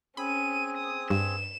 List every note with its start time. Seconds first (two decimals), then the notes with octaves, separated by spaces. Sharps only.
0.17 C4 C#4 G#4 B5 D#7
0.77 D#6
1.10 G2 E7